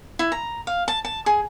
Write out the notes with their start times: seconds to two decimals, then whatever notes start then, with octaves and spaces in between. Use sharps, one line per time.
0.19 E4
0.32 A#5
0.67 F5
0.88 A5
1.05 A5
1.26 G#4